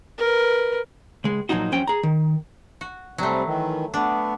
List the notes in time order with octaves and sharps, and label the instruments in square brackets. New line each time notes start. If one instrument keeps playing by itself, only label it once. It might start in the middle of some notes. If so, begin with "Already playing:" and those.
[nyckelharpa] A#4 B4
[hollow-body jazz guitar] C#2 G#3
A#2 F3 F#3 D#4 F#4
F#2 F3 C#4 C5 G5
G#4 A#5
D#3
[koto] F#4
[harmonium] C3 G3 C4 [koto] F#3 A3
[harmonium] D#3 E3
[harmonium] A3 B3 [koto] D4